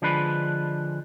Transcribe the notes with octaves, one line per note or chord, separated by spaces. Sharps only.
D3 F3 G#3 D4 B4